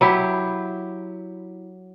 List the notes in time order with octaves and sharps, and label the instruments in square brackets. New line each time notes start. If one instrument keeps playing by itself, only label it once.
[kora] F#3 E4 G4